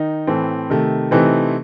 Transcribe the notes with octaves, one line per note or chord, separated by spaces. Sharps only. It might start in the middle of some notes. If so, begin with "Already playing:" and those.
Already playing: D#3 D#4
A2 E3 A3 C4
C3 D#3 A3
C3 E3 A3 C4 D#4